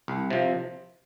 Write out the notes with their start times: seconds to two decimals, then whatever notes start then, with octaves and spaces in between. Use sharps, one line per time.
0.08 C2
0.31 C3 F3